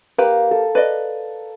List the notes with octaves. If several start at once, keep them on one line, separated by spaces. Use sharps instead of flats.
A#3 G4 B4
A4
B4 D5 D#5